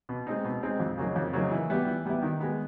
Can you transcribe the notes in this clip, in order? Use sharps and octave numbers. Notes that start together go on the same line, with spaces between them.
B2
G#3 C4 D#4
B2
G#3 C4 D#4
F2
C#3 F#3 A#3 D#4
F2
C#3 F#3 A#3 D#4
E3
G3 B3 E4
E3
G3 B3 E4
D#3
G#3 B3